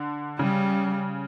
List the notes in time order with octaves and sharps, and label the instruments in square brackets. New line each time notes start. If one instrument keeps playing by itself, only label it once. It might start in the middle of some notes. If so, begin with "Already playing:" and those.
Already playing: [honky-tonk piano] D3
[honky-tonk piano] C#3 [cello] G3